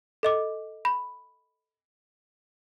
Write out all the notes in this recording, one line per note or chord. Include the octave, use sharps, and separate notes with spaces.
A4 D#5 D6
B5